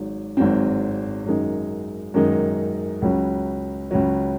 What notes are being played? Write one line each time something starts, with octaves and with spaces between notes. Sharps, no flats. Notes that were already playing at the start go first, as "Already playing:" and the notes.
Already playing: G#1 G#2 F#3
G#1 G#2 F#3 C4
F#2 D#3 G#3 D#4
F#2 D#3 G#3 D#4
C#2 C#3 F#3
C#2 C#3 F#3